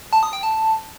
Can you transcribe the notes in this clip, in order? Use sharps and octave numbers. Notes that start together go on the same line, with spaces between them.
A5
D#6
G5
A5